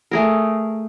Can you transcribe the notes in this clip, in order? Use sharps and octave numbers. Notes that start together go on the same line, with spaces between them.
A3 G#4 A#4